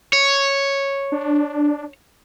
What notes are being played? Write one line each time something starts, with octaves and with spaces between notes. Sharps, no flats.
C#5
D4